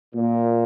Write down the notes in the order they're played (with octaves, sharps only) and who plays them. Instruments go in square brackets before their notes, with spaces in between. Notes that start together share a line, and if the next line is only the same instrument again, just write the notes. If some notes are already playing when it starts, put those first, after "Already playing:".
[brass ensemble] A#2